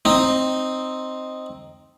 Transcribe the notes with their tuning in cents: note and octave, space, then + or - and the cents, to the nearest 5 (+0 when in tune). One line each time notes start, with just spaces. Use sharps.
C4 +0 D#4 +0